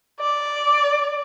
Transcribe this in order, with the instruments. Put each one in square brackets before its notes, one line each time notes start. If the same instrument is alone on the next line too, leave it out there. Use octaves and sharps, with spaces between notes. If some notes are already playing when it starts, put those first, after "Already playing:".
[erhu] D5